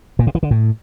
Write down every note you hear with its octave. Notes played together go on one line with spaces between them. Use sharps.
A#2
C3
E3
D3
A2